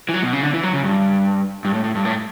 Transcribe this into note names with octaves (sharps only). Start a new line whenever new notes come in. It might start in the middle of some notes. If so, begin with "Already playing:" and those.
E3
F#3
B2
C#3
D3
E3
F#3
C#3
G2
G2
A2
A2
G2
A2